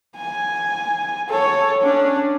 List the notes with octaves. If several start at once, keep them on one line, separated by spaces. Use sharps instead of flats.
G#5
A4 C#5
C#4 D4